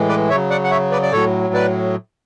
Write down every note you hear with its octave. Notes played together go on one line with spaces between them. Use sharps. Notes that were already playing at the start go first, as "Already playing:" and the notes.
Already playing: A2 E3 G#3
B4 D5
C#3 F#3 C#5 E5
D5 F#5
F#5
C#5 E5
B4 D5
D5
A2 F#3 A4 C#5
B4 D5